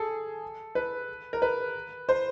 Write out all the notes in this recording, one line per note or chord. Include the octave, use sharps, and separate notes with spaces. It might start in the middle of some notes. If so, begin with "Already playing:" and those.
Already playing: G#4 A4
B4
A#4
B4
C5